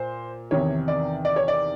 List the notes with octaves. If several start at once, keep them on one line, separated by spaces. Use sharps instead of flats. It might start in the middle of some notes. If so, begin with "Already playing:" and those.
Already playing: A#2 C5
E2 C3 D#3 C#5
D5
D5
C#5
D5